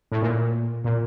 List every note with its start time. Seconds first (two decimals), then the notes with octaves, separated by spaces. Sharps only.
0.12 A2
0.22 A#2
0.85 A#2